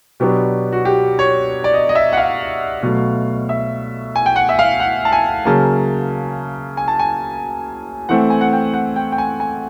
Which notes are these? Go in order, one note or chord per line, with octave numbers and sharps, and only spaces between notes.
B2 F#3 B3 D4 G4
F#4
G4
C#5
D5
D#5
D#5
E5
F#5
F5
B2 F#3 A3
E5
G#5
G5
F#5
E5
F5
F#5
A5
G#5
C#3 F#3 A#3 A5
G#5
A5
G#5
E3 A3 C4 F#5
G#5
F#5
G5
F#5
G5
G5
G#5
G#5